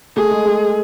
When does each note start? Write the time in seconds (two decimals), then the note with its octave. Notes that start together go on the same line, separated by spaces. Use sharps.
0.16 A3 G#4
0.31 G#3
0.46 G#3